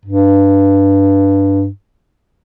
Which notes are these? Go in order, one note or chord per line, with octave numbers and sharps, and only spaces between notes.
G2